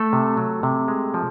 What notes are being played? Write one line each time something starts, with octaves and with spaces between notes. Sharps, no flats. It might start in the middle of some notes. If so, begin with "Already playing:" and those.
Already playing: A3 A4
C3
F#3
C3
G#3
F3